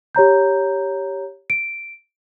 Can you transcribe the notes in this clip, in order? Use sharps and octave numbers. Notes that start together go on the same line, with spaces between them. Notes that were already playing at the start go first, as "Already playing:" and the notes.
G4 C#5 A#5 G6
D7